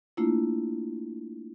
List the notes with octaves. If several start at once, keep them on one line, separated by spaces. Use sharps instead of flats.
A3 A#3 D4 E4 F4